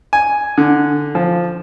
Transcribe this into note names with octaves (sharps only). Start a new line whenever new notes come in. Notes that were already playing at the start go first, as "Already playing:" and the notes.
G#5
D3
F3